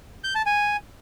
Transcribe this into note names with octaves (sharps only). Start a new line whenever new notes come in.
G6
A5
G#5